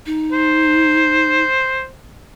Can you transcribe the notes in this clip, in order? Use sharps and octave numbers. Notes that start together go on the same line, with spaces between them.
D#4
C5